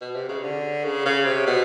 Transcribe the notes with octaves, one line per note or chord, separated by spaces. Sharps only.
B2
C3
C#3
D3
C#3
C#3
C3
B2